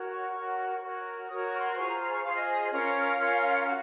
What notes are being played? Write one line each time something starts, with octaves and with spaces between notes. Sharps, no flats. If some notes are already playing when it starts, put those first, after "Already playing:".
Already playing: F#4 A#4 C#5
C#6
F#4 A#4 C#5
F#4 A#4 C#5
F#4 A#4 C#5 D#6
C#6
C6
F4 G#4 C5 C#6
A#5
A#5
C#6
F4 G#4 C5 F5
D#5
D#5
D#5
C#4 F4 A#4 C#5 F5
C#4 F4 A#4 C#5
F#4